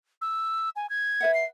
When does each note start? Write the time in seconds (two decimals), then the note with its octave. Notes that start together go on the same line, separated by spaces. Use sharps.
0.21 E6
0.76 G#5
0.90 G#6
1.21 B4 E5 F#5
1.34 C7